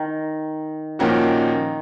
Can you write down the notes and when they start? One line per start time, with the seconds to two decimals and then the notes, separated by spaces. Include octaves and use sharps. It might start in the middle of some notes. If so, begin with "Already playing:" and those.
Already playing: D#3
0.99 A#2 D#3 F3 A#3 C#4 F#4